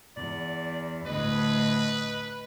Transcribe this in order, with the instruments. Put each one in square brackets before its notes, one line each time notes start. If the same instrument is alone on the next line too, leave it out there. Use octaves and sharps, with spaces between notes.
[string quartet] E2 [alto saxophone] D5
[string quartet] D2 A2 [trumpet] B4 [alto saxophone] D#5